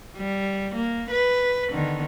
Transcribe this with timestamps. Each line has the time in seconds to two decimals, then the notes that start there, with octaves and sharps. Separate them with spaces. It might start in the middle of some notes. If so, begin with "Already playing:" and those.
0.17 G3
0.76 A#3
1.11 B4
1.71 D3 D#3 B3